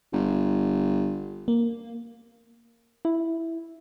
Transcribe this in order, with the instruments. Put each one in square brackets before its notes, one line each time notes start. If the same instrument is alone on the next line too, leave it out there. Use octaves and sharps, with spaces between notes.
[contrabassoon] G1
[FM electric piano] A#3
[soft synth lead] E4